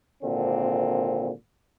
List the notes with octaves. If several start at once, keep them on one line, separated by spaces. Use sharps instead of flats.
G#1 A#2 D3 C4